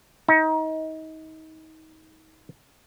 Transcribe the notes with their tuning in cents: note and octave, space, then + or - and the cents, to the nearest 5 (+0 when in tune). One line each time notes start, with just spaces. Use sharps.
D#4 +30